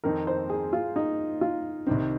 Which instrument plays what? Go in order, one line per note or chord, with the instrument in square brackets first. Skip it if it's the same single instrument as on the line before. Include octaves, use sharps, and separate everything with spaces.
[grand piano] F2 D#3 C4 D#4 [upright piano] A#4
[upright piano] C5
G#4
F4
D#4
F4
[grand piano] C2 C3 D#3 C4 [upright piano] D#4